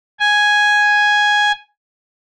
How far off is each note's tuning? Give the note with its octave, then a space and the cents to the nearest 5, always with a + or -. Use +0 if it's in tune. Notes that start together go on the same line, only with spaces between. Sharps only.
G#5 +0